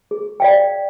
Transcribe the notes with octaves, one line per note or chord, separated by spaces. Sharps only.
G#4
D5 F5 G5